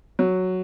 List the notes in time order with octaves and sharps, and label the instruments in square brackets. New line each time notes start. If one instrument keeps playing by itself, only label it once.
[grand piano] F#3